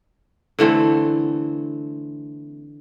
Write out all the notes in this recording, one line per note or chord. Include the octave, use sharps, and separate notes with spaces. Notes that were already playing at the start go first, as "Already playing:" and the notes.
D3 E3 A3 C4